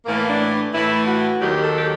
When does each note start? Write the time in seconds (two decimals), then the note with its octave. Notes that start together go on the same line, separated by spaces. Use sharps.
0.05 A2 E3 A#3
0.28 D4
0.72 A2 E3 E4
1.07 F#4
1.40 D#2 D#3 F#3 G4
1.64 A4
1.75 G4